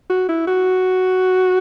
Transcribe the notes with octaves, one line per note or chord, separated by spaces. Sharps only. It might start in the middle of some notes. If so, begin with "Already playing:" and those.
F#4
E4
F#4